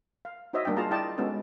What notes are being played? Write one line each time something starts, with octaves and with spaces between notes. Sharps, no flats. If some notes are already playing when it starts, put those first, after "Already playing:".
F5
D#4 F#4 C5 C#5 D#5 E5
G3 A#3 D4 D#5 G5
F4 G#4 F5 A5 A#5
E4 D5 D#5 G5 A5
G#3 B3 C#4 D#4 F#4 A4